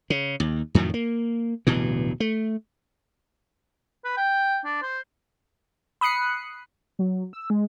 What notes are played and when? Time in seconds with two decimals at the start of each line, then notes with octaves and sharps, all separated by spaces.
0.10 C#3
0.40 D#2
0.75 F2 A2 D#3 F#3
0.94 A#3
1.67 D1 G2 B2 E3
2.20 A3
4.04 B4
4.17 G5
4.65 D4
4.82 C5
6.01 B5 D#6 F#6 C7 C#7
6.99 F#3
7.33 E6
7.50 G#3